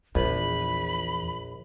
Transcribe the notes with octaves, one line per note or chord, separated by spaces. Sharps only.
A#1 E2 B5